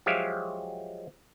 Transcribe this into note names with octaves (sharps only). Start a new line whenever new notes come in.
F3 F#3 G#3 G4 E5 F5